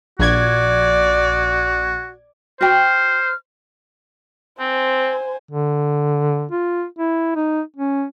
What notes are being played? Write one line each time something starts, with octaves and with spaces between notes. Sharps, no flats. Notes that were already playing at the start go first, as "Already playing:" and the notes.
A#1 F#4 D5 G#6
F#4 C5 G5 F6
C4 C5 G#5
D3
F4
E4
D#4
C#4